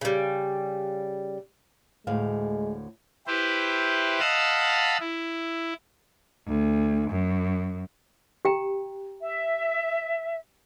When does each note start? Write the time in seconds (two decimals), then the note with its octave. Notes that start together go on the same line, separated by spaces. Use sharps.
0.01 C#3 G3
2.07 D2 A2 G#3 F5
3.27 E4 G4 B4 C5
4.20 D#5 F5 F#5 A5 B5 E6
5.00 E4
6.47 D2
7.10 F#2
8.45 G4 G5 A#5
9.22 E5